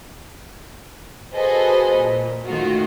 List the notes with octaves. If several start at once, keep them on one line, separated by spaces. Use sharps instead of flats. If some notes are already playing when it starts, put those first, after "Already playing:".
F#4 G#4 A4 B4 C5 D#5
A#2
D#3 A3 F4 F#4